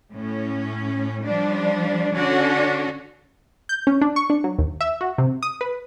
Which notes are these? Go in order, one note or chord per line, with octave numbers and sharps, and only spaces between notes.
A2 C#4
F3 G3 D4
D3 C#4 D4 F#4
G6
C#4
D4
C#6
D4
F#3
D#2
E5
F#4
C3
D#6
B4